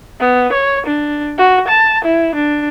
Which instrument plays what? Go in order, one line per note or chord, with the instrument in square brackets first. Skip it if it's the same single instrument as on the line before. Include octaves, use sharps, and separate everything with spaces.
[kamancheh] B3
C#5
D4
F#4
A5
E4
D4